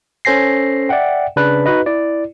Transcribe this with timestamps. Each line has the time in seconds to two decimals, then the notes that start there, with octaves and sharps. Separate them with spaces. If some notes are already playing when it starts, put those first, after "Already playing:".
0.25 C#4 A4 C5 G#5 A#6 C7
0.89 D5 E5 F#5 G5
1.36 C#3 D4 B4 D5 F#6
1.66 D#4 F#4 B4 D#5
1.86 E4 D5